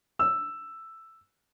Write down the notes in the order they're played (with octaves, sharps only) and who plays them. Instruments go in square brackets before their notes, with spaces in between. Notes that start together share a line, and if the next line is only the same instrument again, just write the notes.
[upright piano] E6